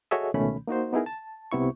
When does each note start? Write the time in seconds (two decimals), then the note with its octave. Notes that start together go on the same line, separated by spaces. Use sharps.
0.11 F#4 G#4 A4 C#5 D#5 E5
0.34 C#2 B2 D#3 A3 C#4 B5
0.68 A#3 D#4 F#4 C5
0.93 B3 D#4 E4 G#4 A#4
1.06 A5
1.52 C2 C3 B3 E4 C#6